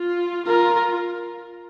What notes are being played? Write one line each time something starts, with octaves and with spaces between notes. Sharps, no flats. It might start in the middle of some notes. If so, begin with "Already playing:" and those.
Already playing: F4
F4 A#4